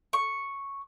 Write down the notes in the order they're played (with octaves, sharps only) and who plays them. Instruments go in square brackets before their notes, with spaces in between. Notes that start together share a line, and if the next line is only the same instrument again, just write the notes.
[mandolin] C#6